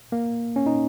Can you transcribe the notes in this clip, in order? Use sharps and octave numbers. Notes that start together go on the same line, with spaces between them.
A#3
C#4
D#4